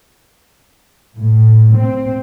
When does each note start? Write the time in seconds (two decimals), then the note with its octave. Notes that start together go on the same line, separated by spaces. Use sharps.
1.17 A2
1.76 C4